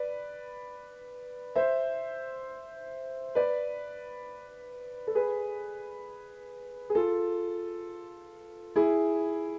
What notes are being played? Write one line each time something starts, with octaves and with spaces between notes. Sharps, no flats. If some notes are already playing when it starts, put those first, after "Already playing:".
Already playing: B4 D5
C5 E5
B4 D5
A4
G#4 B4
G#4
F4 A4
E4 G#4